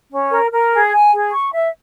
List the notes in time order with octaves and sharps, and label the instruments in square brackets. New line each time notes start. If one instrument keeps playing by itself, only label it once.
[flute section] C#4
A#4
A#4
G#4
G#5
G#4
C#6
E5